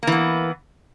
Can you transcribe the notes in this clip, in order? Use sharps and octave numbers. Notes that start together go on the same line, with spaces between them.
E3 A#3 B3